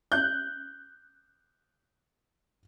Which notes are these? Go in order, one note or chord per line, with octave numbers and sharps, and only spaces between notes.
F#6 G6